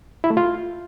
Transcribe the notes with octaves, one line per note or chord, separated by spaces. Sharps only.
E4
A3
F4